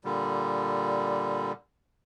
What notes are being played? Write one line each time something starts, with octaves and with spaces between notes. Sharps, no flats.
A#2 D3 G3